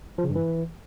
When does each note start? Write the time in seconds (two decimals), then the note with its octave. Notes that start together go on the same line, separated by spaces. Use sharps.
0.18 F3
0.24 C#3
0.30 G2
0.36 E3